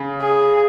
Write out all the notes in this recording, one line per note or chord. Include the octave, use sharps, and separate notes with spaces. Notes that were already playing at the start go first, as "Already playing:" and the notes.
Already playing: C#3
G#4